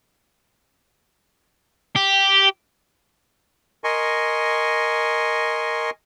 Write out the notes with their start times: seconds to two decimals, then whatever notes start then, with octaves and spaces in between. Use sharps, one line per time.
1.96 G4
3.84 A#4 D#5 G#5 C6 C#6